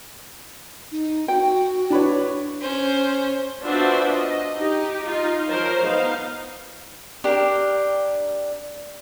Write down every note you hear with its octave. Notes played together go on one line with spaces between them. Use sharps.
D#4
F#4 G5
D4 B4 C#5
C#4 C5
B3 D4 F4 F#4 C5 E5
D#5
D#4 G4
D#4 F4
F3 A#4 C5 C#5
B3 D#4 F5
D4 G4 A#4